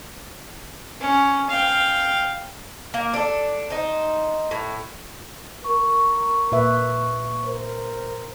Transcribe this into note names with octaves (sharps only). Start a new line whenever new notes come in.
C#4
F5 G5
A#3
D4 A4
D#4 C5
A2
A#4 C#6
A#2 B4 E5
A#4 C5